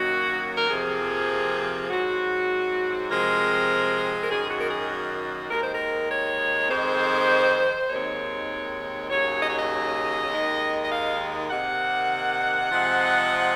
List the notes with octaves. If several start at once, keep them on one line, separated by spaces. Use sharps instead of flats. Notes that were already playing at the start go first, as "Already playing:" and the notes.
Already playing: F#2 D#3 F#3 A#3 F#4
A#4
F2 C3 F3 A#3 G#4
G#4
G#2 F#3 C4 F#4
C3 F3 G#3 C4 A#4
A#4
F#2 D#3 A#3 G#4
F#4
A#4
G#4
F#4
D#2 D#3 G#3 A#4
C5
A#4
C#5
F2 D#3 G#3 C4 C5
D#2 D#3 G#3 C4 C#5
D#2 C#3 F#3 C#5
D#5
C#5
D#5
D#2 D#3 G#3
D#5
F5
C3 D#3 A#3 F#5
C3 F3 G#3 C4